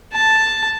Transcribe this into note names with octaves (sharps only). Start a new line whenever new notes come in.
A5